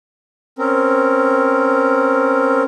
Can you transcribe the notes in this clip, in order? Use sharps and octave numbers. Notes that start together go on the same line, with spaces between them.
C4 C#4 A#4